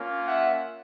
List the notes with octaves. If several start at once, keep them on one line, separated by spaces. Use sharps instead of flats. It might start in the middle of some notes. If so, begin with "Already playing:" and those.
Already playing: A#3 C#4 F4
E5 F#5